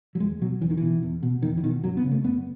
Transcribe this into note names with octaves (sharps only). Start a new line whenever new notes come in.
F#3
E2 G#3
B2 F#3
E2 E3
D#3
B2 E3
E2
B2
E2 D#3
E3
B2 D#3
F#2 F#3
B3
C#3
A3
F#2 B3